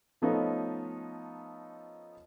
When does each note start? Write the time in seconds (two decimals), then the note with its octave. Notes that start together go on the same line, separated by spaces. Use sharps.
0.22 F3 A3 B3 C#4 D#4 F4